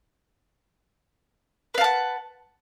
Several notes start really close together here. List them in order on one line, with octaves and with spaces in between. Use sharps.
B4 F5 A5 F#5